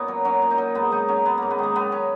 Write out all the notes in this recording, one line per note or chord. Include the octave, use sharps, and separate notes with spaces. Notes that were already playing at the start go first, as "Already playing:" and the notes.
Already playing: A#2 B3 C#4 D#4
F#3
F#3 C#4
A#2
D#4
F#3
G#2 B3
F#3 D#4
F#3 C#4
F#3 B3
G#2 A#3
B3
D#3 A#3
F#3 B3
C#4